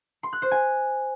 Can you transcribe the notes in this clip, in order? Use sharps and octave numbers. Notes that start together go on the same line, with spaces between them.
C6
F#6
C5
G#5